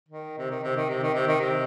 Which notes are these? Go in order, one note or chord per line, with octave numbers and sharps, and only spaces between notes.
D#3
C3
D#3
C3
D#3
C3
D#3
C3
D#3
C3